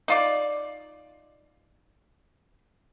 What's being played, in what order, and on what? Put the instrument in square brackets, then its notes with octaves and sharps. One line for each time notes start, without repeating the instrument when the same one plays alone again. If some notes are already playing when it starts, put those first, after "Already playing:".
[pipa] D#4 F4 D5